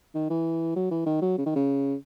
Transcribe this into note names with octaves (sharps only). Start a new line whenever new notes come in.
D#3
E3
F#3
E3
D#3
F#3
C#3
D#3
C#3